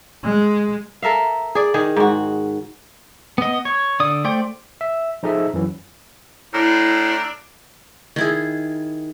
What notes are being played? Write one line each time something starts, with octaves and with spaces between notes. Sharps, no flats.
G#3
A4 A#4 E5 F5
G#4 D5
D#3 G#4
G#2 F#4
B3 D#5
C#5
D3 D5 D#6
A3 C5 D5 G5
E5
F3 D#4 G#4 A4 D#5 E5
F#2 E3 F#3
A2 D4 E4 A#5 E6 F6
D#3 E4 G#4